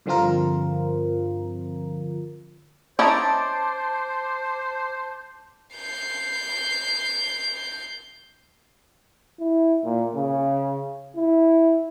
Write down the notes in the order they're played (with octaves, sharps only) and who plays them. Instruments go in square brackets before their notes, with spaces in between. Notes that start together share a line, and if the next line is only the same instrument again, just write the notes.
[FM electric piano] G2 D3 F3 C4 F4 A#4
[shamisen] C#4 D#4 E4 [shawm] C5 [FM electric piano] A5 D6
[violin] G6 C7
[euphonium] E4
A#2
C#3
E4